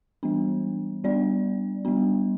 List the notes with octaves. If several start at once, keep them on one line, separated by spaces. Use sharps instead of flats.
E3 G3 B3 D4
G3 B3 D4 D5
G3 B3 D4